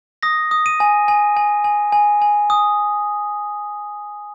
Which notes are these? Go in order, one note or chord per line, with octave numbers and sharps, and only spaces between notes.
D#6 A#6
D#6
D#7
G#5
G#5
G#5
G#5
G#5
G#5
D#6